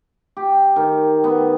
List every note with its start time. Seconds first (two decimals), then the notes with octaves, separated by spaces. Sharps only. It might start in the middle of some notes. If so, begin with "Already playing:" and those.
0.37 G4
0.76 D#3
1.24 B3